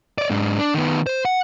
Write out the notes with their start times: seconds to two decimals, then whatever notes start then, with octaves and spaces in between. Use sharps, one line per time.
0.18 C#5 D5
0.30 G#2 D4
0.59 D4
0.74 D#3 B3
1.07 C5
1.25 F#5